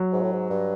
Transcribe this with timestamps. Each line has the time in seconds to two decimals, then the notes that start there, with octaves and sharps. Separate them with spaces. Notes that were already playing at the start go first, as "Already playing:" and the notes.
Already playing: F#3
0.12 G#2
0.23 A2
0.33 G#2
0.50 G2